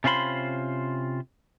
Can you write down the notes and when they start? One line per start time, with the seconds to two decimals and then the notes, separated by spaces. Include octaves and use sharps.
0.04 C3 C#4 F4 C5 B5 C6